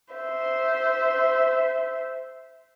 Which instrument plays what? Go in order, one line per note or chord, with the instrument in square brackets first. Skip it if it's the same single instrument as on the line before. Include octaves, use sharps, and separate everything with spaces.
[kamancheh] C5 E5